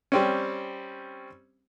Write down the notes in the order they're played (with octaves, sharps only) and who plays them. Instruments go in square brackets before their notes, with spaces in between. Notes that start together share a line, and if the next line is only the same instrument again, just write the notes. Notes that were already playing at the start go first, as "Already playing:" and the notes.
[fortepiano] G3 C4 C#4